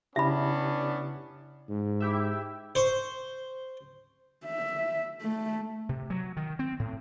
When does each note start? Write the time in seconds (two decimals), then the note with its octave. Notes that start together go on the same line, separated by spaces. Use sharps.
0.16 C#3 B3 C#4 D4 E4 G4 E5 B5
1.69 G#2
2.00 E4 G4 E5
2.75 C5 C#6
4.46 E5
5.22 A3
5.89 C3
6.10 F#3
6.37 D#3
6.59 C4
6.79 A2